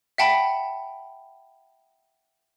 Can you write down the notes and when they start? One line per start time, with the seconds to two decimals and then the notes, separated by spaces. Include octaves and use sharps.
0.18 E5 F#5 G5 A5 B5